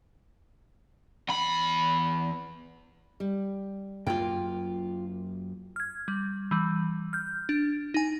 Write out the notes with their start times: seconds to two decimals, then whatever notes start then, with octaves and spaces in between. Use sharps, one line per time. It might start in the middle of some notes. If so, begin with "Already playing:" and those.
1.29 E2 B5
3.20 G3
4.07 F#2 A#3 F4 G5
5.76 F6 G#6
6.08 G3
6.51 E3 G3
7.13 F6 G6
7.49 D4
7.94 D#4 G#5